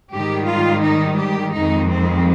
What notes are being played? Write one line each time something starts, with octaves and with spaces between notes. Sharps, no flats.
G#2 D#3 G3 G4
F4
D#4
G4
F2 D#3 G#3 D#4
C4